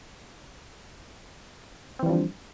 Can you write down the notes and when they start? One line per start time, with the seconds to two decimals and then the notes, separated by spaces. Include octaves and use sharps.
1.99 C4
2.03 E3
2.06 G3
2.10 F3
2.13 D3